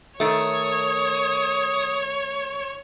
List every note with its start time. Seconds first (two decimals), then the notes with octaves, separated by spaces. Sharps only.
0.20 D#3 A3 C#5 D#6